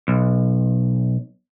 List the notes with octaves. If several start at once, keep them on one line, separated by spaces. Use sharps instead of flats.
B1